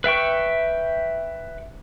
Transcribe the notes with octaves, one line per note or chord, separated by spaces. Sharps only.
B4 E5 G5 C#6